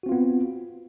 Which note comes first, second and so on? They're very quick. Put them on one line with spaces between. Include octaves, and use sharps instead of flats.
F#4 C4 F4 B3